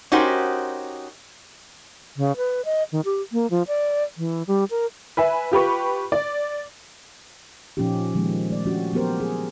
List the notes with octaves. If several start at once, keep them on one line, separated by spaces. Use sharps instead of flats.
C#4 D#4 F#4 G4 A#4 C5
C#3
B4
D#5
D#3
G4
A#3
F3
D5
E3
G3
A#4
B4 E5 G#5
F4 G4 B4 C#6
D5
A#2 F3 C#4 D#4 F4 G4
D#3 F3 G#3 A#3
A3 D5
F3 C#4 D4 F#4 G4
F3 F#3 B3 G4 A#4 C5
G#4